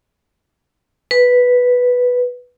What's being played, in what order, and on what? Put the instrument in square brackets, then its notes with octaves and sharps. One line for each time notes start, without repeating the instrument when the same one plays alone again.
[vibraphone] B4